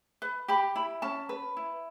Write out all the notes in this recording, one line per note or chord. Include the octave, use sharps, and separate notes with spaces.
B4
G4 B5
E4 B5
C#4 A5
B4
E4